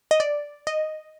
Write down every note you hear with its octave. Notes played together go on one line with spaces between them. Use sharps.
D#5
D5
D#5